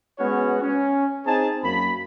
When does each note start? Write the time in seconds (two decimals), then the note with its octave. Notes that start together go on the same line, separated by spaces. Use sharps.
0.19 G#3 B3 C#4 F#4 C#5
0.62 C#4
1.26 C4 D#4 G#4 A5
1.63 F#2 A#3 B5